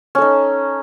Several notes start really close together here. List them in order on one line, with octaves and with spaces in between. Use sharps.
C#4 A4 D#4